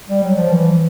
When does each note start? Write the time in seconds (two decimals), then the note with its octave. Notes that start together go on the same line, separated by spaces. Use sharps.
0.10 G3
0.23 F#3
0.37 F3
0.50 E3